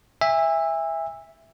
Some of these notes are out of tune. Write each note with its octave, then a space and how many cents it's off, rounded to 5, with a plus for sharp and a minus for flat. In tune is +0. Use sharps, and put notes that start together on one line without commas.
E5 +0 G#5 -35